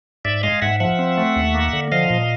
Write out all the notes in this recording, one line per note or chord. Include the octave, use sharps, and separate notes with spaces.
G#2 D5 E5
G#3 D#5 F5
G#2 E5 F#5
F3 E5 F#5
C4
A3
D#2
A#3
D3
F3 D#5 F5
A#2